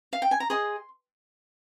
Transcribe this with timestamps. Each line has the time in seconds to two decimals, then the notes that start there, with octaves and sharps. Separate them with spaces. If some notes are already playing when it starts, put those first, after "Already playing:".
0.13 F5
0.22 G5
0.31 G#5
0.40 A#5
0.50 G#4 D#5 C6